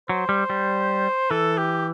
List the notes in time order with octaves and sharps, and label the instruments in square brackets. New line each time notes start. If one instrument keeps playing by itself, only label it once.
[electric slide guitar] F#3 [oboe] C5
[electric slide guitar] G3
G3
[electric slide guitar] E3 [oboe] A4
[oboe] G4